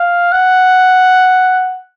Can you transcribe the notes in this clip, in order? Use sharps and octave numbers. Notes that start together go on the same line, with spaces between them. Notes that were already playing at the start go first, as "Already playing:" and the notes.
Already playing: F5
F#5